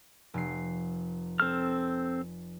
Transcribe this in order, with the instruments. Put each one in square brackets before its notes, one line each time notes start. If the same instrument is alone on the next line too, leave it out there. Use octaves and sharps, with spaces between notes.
[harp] F1 C7
[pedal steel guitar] C4 A4 F6